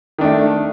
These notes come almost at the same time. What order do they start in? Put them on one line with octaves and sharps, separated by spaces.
D#3 D4 A3